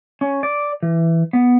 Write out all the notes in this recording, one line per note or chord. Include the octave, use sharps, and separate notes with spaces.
C#4
D5
E3
B3